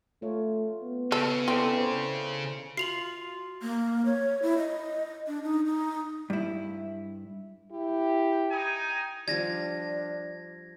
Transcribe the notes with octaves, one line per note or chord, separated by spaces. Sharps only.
A3 F4 C#5
B3
C#3 A4
C4 E4 A4 D5
C5
F4 F#4 C7 F7 F#7
A#3
C#5
E4
D#5
D4
D#4
D#4
G2 E4
E4 G4
D#4 G5 G#5
F3 G3 D4 G#6 A#6